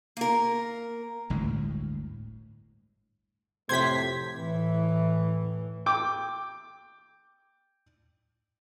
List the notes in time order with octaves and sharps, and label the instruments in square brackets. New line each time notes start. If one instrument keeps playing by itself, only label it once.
[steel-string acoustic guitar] A#3 A#4
[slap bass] G1 D2 A2 G#3
[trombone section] F2 A2 C3 [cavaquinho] C5 [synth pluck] G#6 B6
[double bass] A2 E3
[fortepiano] G5 D6